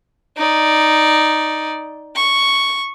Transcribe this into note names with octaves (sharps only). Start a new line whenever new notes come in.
D#4 D5
C#6